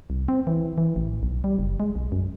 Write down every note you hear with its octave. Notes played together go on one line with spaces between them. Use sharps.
C2
C4
E3
E3
A1
B1
G3
F#1
G#3
B1
F#2